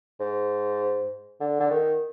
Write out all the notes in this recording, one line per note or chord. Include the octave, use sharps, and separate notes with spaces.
G#2
D3
D3
D#3